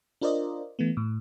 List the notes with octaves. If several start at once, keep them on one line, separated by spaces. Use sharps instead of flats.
D4 F4 A#4 C5 D5 D#5
E3 A3 B3
A2